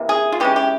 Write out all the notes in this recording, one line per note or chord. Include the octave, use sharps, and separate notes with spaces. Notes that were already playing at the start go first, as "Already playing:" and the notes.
Already playing: C3 E3 A#3
G#4
F4
E3 G#3 C#4 G4
G4